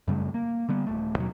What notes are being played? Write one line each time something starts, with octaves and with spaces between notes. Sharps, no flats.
F#2 C#3 G3 A3
A#3
D3 G3 B3
D#1 A3
D#2 B2 F#3